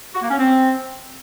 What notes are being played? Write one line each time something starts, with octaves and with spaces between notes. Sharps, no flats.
F#4
A#3
C#4
C4